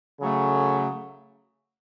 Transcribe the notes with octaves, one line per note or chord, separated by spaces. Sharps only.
C#3 F#3 A3